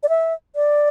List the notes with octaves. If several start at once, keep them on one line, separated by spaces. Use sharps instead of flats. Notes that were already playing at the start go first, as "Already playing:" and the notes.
D5
E5
D5